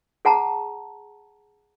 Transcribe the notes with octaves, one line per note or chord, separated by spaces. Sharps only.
G#4 F#5 A5 A#5